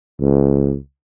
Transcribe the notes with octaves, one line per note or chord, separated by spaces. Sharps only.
C#2